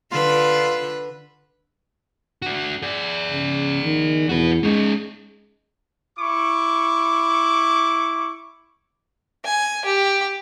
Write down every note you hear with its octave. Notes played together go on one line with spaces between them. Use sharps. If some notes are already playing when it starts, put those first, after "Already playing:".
D3 F4 B4
D4 F#4
G#4 D5
C#3
D#3
E2 F#4 B4
G#3 C#4 D#4
E4 C#6 D6
G#5
G4